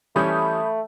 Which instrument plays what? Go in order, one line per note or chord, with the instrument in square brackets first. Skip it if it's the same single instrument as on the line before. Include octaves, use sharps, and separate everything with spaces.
[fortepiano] E3 G3 C#4 [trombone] A3 [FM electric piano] B5 D#6 G6